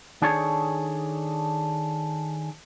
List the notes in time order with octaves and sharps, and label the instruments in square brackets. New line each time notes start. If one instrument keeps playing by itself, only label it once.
[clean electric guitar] D#3 D4 G#4 A4 C#5